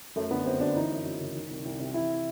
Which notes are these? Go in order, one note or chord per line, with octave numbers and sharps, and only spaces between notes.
F#2 A3
D3 B3
F#2 C4
D3 D4
E3 D#4
F#2
F#2
C#3
D#3
C2
C2
C3
E3 E4